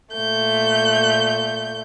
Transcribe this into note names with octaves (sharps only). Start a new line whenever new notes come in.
A#2 A3 G6